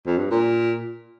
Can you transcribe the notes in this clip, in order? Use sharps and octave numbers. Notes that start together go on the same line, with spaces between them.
F2
G2
A#2